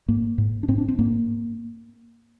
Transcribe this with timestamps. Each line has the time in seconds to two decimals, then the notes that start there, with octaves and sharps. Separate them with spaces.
0.08 G#2 A#3
0.38 G#2
0.63 D4
0.68 G#2 C4
0.78 D4
0.88 C4
0.99 G#2 A#3